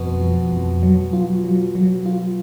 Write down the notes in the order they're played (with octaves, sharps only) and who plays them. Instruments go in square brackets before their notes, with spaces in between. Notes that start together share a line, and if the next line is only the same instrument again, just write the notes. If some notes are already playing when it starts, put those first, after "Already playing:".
Already playing: [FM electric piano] F2 [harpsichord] B2
[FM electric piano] F3
F2
F#3
F4
F#3
F#3
F4